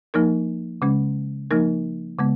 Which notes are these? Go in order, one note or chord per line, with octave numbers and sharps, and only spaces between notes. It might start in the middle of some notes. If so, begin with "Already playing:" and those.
F3 A#3 D#4 A#4
C#3 G#3 C#4
F3 A#3 D#4 A#4
C#3 G#3 B3